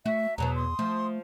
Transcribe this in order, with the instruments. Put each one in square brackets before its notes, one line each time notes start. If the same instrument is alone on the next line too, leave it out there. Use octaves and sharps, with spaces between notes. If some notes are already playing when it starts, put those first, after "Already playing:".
[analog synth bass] A3 [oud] F#4 [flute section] E5
[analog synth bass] E2 [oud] B2 F#3 B3 [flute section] A#5
[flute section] C6 D#6
[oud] F3 [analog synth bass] A3